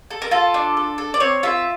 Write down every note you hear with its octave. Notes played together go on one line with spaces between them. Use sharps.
A4
A#4
F4 A4
D4
A4
A4
D5
C4 C#5
F4 E5